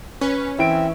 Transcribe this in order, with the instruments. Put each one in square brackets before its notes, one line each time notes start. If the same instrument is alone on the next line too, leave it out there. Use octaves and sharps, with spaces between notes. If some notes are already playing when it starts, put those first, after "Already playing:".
[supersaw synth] C#4 [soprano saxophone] B4
[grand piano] E3 D7 [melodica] C4 [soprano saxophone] E5